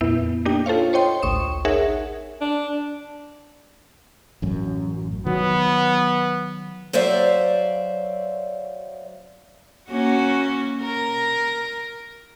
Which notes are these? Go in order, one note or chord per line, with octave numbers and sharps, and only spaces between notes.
F2 A#2 B3 E4
A#3 D4 D#4 G4 G5
F4 A4 C5 C#5 F5
C5 C#5 D#5 G5 C6
A1 D2 C#6 D#6 E7
D#4 G#4 A#4 C#5 E5 F#5
D4
A1 F#2
D#3 F#3 B3
F#3 C5 D5 E5 F5
A#3 C#4 F#4
A#4